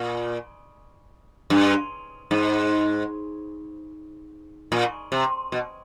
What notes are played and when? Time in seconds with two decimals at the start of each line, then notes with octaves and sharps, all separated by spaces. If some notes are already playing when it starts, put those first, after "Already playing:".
Already playing: A#2
1.50 G2
2.31 G#2
4.72 A#2
5.12 C3
5.52 B2